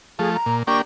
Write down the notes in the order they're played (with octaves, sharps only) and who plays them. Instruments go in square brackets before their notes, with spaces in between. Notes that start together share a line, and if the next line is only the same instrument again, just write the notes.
[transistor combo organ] F3 A3 [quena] G#4
[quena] A#5
[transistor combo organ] A#2
[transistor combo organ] A#3 D4 G4 [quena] C#6